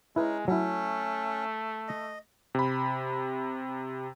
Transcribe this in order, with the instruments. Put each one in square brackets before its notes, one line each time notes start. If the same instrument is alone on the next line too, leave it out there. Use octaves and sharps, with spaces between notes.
[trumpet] G#3 [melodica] C#4 D#4 [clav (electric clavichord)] E4 B4
[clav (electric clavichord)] F#3 E4 [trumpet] A3 [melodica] C#4
[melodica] D#5
[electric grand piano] C3 B5